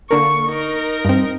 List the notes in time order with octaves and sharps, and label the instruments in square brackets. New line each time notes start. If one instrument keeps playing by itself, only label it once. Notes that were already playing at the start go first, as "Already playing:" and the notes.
[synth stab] D3 A#3 [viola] C#6
[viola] D#4 A#4
[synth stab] G2 C4